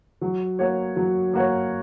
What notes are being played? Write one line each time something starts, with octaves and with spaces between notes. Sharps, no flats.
F#3
A#3 F#4 C#5
F#3
A#3 F#4 C#5